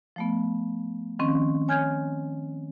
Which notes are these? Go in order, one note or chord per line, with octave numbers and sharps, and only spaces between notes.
F3 A3 B3
D#3 F3 C4 C#4
C#5 G#5 F6 G6 G#6